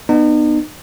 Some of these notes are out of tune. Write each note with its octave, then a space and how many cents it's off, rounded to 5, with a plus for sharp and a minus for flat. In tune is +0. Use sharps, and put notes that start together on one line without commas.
B3 +0 D#4 -40